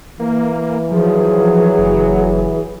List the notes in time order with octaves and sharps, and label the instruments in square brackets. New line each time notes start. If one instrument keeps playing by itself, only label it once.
[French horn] E3 [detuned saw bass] A#3
[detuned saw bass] F3 [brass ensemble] F#3 [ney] G#4
[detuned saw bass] F#1